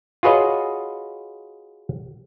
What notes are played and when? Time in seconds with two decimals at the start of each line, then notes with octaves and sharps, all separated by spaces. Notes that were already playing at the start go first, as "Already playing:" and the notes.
0.23 F4 F#4 G#4 B4 C#5 D#5